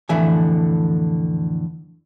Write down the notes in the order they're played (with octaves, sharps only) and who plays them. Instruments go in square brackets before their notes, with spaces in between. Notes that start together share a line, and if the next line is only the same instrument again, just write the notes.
[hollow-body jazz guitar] F2 A2 D3 E3 E5 G#5